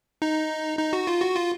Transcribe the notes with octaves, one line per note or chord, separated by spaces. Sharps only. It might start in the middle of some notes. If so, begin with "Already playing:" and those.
D#4
D#4
F#4
F4
F#4
F4